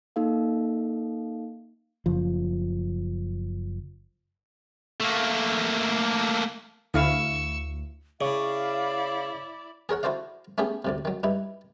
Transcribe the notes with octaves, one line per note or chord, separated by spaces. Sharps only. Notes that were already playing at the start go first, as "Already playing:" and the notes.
A#3 D#4 A4 F5
F#1 F3
A3 A#3
D2 E4 F5 C#6 E6
C#3 E4 C#5 D5 F5
G#4 A#4 C#5 F#5
E4 F#4 A4 C5 D5 F5
A3 B3 C#4 G4 G#4
D2 A2 C3
D#3 F#3
G2 D#4 E4